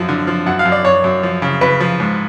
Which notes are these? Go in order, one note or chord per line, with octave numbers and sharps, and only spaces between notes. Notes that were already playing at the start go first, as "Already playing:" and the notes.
Already playing: F#2 F3
D3
F3
F#2 F#5
F5
F#2
D5
F#2 C#5
F#2
F3
C#3
C#3 B4
F3
G#2